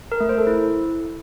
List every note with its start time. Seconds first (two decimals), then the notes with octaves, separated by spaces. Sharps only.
0.12 A#4
0.20 A3
0.29 C5
0.38 A4
0.47 E4